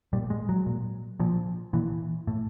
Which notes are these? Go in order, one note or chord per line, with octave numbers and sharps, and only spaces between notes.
A#2 G3
G#3
F#3
A#2
A#2 F3
A#2 E3
A2